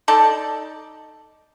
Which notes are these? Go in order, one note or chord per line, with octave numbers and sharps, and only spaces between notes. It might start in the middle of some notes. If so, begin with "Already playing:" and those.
D#4 A4 D5 A5